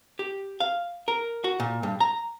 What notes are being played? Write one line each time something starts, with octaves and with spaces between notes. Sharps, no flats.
G4
F5
A#4
F#4
A#2
G2
A#5